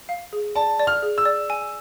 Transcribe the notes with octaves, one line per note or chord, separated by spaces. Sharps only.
F5
G#4
D5 A5
D5
F6
G#4
E6
D5
G#5